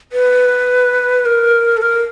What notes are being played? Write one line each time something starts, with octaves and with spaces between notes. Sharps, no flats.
B4
A#4
A4
A#4